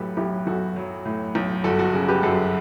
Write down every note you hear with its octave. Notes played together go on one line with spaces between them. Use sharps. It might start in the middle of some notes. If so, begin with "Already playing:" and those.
Already playing: B1 A2 F#3 G4 A4 B4
B1 E4 G4
B1 F#4 A4
F#3
A2
B1
G1 F#4 A4
F#4 A4
C#3
G4 B4
F#2 F#4 A4